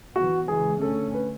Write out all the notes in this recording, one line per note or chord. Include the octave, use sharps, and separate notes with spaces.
E3 B3 F#4
C#3 E3 G#3 G#4
D3 A3 C#4 A4
B4